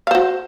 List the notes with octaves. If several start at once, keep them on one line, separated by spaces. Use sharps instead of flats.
F#4 C5 F5